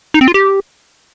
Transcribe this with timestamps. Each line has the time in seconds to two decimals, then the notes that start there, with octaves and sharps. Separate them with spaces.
0.14 D#4
0.21 C4
0.28 F4
0.34 G4